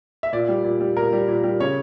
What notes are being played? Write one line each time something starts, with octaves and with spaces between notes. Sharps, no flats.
E5
A#2 D5
G3
A#2
G3
A#2 A#4
G3
A#2
G3
C#3 C#5